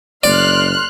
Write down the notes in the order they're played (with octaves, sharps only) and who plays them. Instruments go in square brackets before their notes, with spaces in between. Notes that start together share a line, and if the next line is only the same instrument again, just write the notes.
[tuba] F#1 [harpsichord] D5 [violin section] C6 F6 F#6